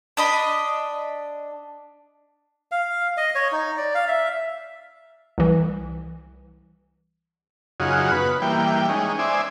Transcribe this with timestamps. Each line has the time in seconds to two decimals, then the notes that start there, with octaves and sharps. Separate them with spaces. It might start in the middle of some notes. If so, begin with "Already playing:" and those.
0.17 D4 D#5 B5
2.72 F5
3.17 D#5
3.35 C#5
3.52 D#4
3.78 D5
3.94 F5
4.08 E5
5.38 C2 E3
7.80 F#2 C#3 D#4 F4 F#4 G#4
8.12 B3 B4
8.42 E3 G3 A#3 G5
8.89 G#3 C#4 D#4
9.19 C5 D5 E5 G#5